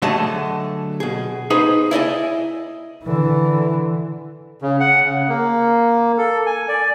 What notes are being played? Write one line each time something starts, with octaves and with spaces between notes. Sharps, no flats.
D3 F#3 A3 G#4 D#5 A5
B2 G#4
D#4 G#4 B4 C5
E4 D5 D#5 G#5
D3 E3
C#3
F#5
C#3
A#3
A4
G#5
D5